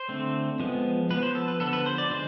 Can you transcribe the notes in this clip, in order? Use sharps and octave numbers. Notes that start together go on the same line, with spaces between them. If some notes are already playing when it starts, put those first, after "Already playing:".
Already playing: C5
D3 A3 C4
F3 G#3 B3
F3 B3 B4
C5
A4
B4
D3 F3 B3 A4
B4
C5
D5
D3 F3 G#3 C5